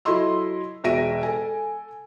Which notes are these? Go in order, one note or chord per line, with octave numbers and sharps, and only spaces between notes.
F#3 E4 A4 D#5 C6 E6
E1 B2 E5 A#6 D7 D#7
A4 G#5